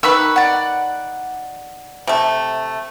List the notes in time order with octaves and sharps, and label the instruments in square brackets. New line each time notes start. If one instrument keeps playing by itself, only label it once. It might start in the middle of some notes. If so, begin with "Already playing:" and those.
[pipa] D#3 B4 [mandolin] B5 C#6 E6
[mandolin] D5 F#5
[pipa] C3 A3